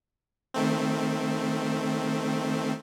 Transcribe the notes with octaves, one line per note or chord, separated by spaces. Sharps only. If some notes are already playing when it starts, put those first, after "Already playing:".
D#3 A3 C4